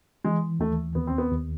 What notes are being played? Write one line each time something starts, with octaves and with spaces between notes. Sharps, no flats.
E3 G#3
D#2 A3
D#2 B3
C4
B3
D#2